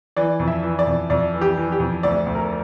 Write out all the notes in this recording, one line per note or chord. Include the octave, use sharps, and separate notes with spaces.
E3 D5
F2
E5
E3
D5
F2
F2 D5
E3
G4
E3
G4
F2
D2 D5
D2
A#4